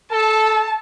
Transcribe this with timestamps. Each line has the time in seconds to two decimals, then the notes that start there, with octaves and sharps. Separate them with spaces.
0.12 A4 A5